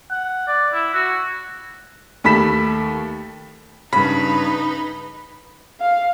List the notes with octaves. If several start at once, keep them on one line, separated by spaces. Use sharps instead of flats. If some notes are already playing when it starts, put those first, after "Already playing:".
F#5
D5
E4
F#4
D#2 A3 B5 B6 E7
G2 C#3 D#4 B4 B5
F5